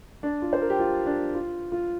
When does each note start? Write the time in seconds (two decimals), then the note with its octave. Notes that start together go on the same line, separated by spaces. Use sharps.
0.23 D4
0.42 F4
0.53 C5
0.62 A#4
0.70 G4
0.79 F4
1.06 D4
1.35 F4
1.72 F4